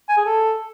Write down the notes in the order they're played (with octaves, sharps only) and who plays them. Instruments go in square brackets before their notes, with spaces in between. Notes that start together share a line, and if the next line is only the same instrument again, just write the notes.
[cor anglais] G#5
G#4
A4